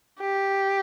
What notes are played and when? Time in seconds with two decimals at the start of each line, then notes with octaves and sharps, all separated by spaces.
0.21 G4